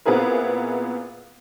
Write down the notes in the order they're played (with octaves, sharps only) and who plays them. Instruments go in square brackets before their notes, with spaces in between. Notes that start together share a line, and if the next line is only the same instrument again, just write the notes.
[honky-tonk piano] A#2 B3 C4 E4 G#4 A#4